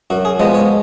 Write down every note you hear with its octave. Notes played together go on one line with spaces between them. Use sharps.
F#2 F#4
G#4
F3 G#3 B3 D#5
C#5